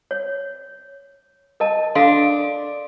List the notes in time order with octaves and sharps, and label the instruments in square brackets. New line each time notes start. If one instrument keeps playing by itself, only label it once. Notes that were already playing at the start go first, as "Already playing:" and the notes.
[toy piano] C#5
A#4 D#5 A5
[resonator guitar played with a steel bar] D4 [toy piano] A4 F5 C6